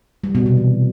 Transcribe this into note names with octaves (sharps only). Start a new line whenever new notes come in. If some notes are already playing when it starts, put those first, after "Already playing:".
G3
B2
C3
E3